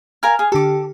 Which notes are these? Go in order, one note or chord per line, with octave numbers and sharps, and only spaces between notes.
A#4 F5 G#5 F6
G#4
D3 G4 A4 D6